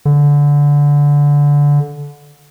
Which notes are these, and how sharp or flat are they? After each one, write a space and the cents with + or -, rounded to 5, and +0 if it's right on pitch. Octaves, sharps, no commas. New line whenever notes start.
D3 -20